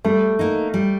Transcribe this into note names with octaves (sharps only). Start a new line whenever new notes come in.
G3 A3
A#3 D#4
G3